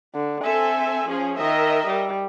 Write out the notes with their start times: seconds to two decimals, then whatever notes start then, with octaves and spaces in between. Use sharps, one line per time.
0.15 D3
0.44 C4 A4 E5 G#5
1.08 F3 C#4 G#4
1.39 D#3 A#4 D#5 E5
1.87 G3